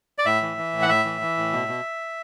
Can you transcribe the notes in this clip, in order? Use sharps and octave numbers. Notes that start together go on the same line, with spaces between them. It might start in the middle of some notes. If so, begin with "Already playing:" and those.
D5
A2 E5
E3
E3
A2
F#5
A2 E5
E3
E3
A2
B2
B2